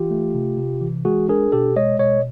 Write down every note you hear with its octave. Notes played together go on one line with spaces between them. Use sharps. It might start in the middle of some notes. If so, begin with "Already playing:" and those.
Already playing: E3 F4 G4
A3
C3
C3
E3
G#3 F#4 G#4
D4 G#4 A#4
B2 G4 A4
G#3 C#5 D#5
B2 C#5 D#5